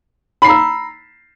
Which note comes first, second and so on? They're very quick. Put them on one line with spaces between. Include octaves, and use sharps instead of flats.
B5 C7 A#5 E6